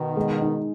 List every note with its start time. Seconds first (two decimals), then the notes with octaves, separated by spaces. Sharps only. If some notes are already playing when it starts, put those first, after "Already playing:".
Already playing: B2 D#3
0.17 G#3
0.41 D#4